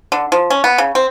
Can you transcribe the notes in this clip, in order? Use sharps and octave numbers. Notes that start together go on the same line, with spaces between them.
D3
F3
C#4
B3
C#3
C4